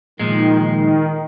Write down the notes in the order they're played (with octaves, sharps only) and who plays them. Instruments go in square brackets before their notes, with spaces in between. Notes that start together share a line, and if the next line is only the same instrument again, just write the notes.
[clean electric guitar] A#2 F3 G#3 [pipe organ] D#3
[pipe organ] D#3